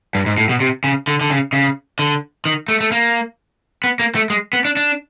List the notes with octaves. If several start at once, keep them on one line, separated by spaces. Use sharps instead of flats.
G2
G#2
A2
B2
C3
C#3
D3
D3
C#3
C#3
D3
D#3
A3
A3
A#3
B3
A#3
A3
G#3
B3
D4
D4